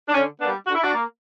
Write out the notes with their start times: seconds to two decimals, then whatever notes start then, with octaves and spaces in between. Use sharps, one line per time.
0.09 D4
0.14 D3 C#4
0.41 G3 A#3 B3 D4
0.67 D3 F#4
0.75 E4
0.83 D4 F#4
0.94 A#3